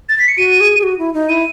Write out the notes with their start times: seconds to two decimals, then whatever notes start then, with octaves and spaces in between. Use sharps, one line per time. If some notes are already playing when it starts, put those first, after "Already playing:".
0.09 A6
0.19 B6
0.28 C#7
0.37 F#4 D#7
0.60 G#4
0.79 G#4
0.83 F#4
0.99 E4
1.14 D#4
1.29 E4 D#7